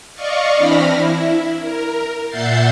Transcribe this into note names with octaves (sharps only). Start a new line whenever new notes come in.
D5 D#5 F5 C#6
E3 C4 D4 B5 F6 A#6
E4
A#4
A#2 E5 F#5 G6 A6 C7